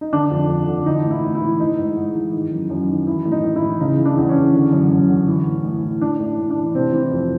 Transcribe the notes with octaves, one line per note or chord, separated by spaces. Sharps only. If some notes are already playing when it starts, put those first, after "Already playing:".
D#4
D3 D4
F2
F2
D3
E3 D#4
A2
E4
A2
E4
E3
E3 D#4
G#2
G#2
E3
D#3
F#2
F#2
D#3
E3 E4
A2
D#4
A2
E4
E3
C#3 D#4
E3
D4
E2
C#4
E2
D3
F#2
F#2
D3
E3
A2
A2
E3
E3 D4
A2
A2
D4
E3
C3 C4
E3
F2